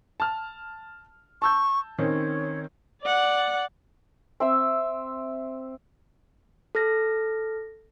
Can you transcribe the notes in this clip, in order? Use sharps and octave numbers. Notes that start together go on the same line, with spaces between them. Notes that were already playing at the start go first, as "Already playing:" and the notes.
A5 F6
A5 C#6 E6 G6
D#3 C4 C#4 C#5
D5 F#5
C4 E5 E6
A4 F6 A#6